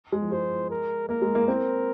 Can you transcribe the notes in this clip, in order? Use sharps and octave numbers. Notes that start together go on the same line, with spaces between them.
G#3
F3
G#3 C5
A#4
A#3 A#4
G#3
A#3
C4 A#4